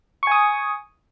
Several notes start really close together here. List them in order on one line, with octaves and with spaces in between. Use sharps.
C#6 G#5 D#6